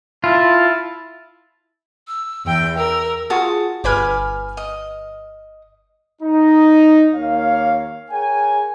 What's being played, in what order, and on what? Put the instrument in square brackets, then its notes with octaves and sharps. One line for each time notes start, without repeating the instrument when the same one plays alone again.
[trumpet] E4 [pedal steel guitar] F4 [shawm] A5
[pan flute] E6
[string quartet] E2 G5
[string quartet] A#4 [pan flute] E6
[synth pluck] F4 G#4 [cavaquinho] F#4 A5 D#6
[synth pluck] G1 B4 F6 [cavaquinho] G#5 B5 D6
[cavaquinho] D#5
[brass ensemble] D#4
D#2 A#3 C#5 F5
G#4 A#4 C#5 G5 G#5